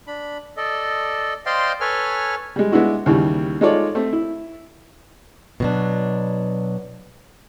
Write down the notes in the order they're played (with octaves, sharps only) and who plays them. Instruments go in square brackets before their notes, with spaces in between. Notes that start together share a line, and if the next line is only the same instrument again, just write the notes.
[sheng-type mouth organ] D4 B5
A4 D5 D#5
C5 D5 D#5 F5 G5 C6
A4 B4 C#5 G#5 F6
[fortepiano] G3 G#3
G#3 B3 D4 E4 F#4
D#2 C#3 E3 G3
G#3 D#4 F4 A4 C#5 D5
A3 C4
E4
[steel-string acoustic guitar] B2 F#3 D4